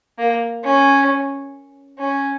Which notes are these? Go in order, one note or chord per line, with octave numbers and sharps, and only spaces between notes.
A#3
C#4
C#4